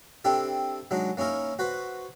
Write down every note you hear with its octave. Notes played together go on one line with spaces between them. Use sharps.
C4 D4 E4 G4 A4
F#3 G#3 D4 D#4
A#3 C#4 D#4 E4 A#4
F#4 B4 C5